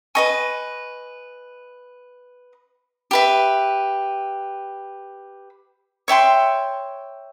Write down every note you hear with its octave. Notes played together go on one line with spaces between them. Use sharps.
B4 D#5 G#5 C#6
G4 B4 E5
C#5 E5 G5 C6